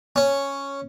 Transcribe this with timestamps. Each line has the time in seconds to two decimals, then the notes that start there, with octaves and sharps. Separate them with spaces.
0.16 C#4